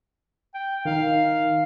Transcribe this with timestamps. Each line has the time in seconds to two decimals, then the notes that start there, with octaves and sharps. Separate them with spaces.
0.54 G5
0.85 D#3 D#4 F5